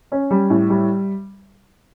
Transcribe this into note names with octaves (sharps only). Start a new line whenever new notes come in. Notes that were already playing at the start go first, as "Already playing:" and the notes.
C#4
G3
A2
G3